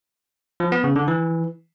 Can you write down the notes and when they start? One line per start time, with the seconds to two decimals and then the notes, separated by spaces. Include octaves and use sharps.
0.60 F3
0.72 B3
0.84 C#3
0.96 D3
1.08 E3